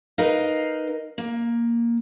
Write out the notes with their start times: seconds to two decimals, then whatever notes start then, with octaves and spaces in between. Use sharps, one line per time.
0.18 D#4 A#4 B4 D#5 F5
1.18 A#3